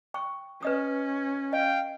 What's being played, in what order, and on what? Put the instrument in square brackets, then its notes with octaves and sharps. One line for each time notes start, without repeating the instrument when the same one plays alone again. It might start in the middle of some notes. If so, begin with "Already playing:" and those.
[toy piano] G5 C#6
[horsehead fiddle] C#4 [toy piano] B4 D#5 D#6
[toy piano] D#5 [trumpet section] F5 G5